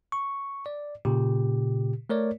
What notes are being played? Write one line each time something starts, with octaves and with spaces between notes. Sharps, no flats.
C#6
D5
A#2 C#3 G4
A3 A#4 C#5 D5